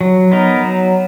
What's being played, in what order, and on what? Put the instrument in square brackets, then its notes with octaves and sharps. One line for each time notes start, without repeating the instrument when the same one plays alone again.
[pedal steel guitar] F#3
B3 D#4 A#4
F#3